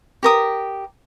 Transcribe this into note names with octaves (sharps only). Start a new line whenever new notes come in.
G4 A#4 D#6